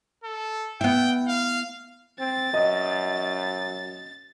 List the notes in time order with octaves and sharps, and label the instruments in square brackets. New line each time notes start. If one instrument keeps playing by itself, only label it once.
[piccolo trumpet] A4
[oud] B3 E4 [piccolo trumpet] G5
[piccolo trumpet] F5
[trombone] C4 [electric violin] A6
[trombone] F#2 [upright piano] D#5